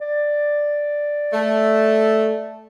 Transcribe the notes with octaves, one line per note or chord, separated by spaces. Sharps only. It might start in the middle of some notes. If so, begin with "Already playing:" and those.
D5
A3